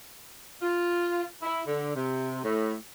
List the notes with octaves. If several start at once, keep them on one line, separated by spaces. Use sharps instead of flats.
F4
E4
D3
C3
A2